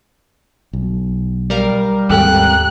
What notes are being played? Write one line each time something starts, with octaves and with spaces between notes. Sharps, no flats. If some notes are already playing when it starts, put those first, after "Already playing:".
B1
G3 A#4 F5
D#2 G#2 C4 G4 A4 G5 F#6